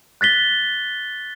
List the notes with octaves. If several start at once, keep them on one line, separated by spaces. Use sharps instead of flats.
F#6 A6 B6 G7